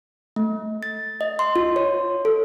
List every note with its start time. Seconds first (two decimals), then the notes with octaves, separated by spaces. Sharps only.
0.36 A3
0.83 A6
1.21 D#5
1.39 C6
1.56 F4
1.76 C#5
2.25 A4